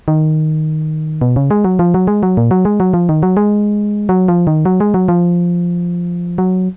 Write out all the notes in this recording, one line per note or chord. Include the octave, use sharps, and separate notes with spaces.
D#3
B2
C#3
G#3
F#3
F3
F#3
G#3
F#3
A#2
F#3
G#3
F#3
F3
D#3
F#3
G#3
F#3
F3
D#3
F#3
G#3
F#3
F3
F#3